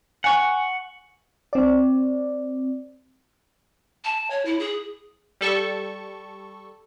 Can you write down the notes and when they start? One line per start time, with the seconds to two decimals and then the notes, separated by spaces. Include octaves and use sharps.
0.24 F#5 G#5 C#6
1.53 C4 D5
4.04 A5
4.30 C#5
4.45 E4
4.59 G#4
5.41 G3 A4 C#6